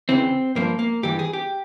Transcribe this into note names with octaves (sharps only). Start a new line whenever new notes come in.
E2 C#3 E3 C4
G2 F3 A#3
A#3
G2 E3 G4
G#4
G4